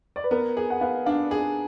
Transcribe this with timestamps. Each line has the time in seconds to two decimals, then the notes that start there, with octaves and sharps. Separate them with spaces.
0.16 D5
0.24 B4
0.31 B3 A#4
0.57 G#4
0.70 F#5
0.81 B3 F5
1.06 D4 F5
1.31 G#4